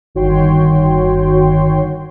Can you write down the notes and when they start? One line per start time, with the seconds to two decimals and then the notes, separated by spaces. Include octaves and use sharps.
0.15 G1 D#3 F#4 C#5 G5 C6